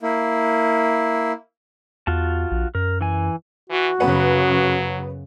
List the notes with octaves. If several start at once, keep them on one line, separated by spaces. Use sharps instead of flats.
A#3 E4
E2 F4 F#4 A5
A#1
F#2 A#4
E3 G#5
E3 F#4
F#2 C#3 F#3 B3 B4 F#5